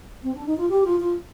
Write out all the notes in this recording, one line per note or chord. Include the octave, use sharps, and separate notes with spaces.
C4
D4
D#4
F4
G4
F4
F4